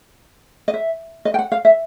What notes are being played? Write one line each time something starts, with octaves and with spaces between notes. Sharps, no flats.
D#5
E5
D#5
G5
F#5
F5
E5